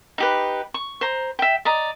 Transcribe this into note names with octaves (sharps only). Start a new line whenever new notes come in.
D#4 G4 B4
C#6
C5 A#5
E5 G5
D5 D#5 A#5